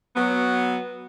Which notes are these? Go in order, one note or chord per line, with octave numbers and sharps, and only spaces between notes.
F#3 B3